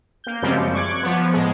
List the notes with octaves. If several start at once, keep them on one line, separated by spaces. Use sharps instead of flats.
A#3 G6
F#2 C#3 F3 G3 G#3 C4
C#7
C#6 D6 F#6 G#6
F3 B3
A2 G#3